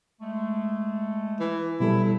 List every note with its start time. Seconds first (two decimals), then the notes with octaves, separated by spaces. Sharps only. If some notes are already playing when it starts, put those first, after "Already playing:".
0.21 G#3 A3
1.40 E3
1.80 B2 F#3 G3 E4 A4
2.04 A2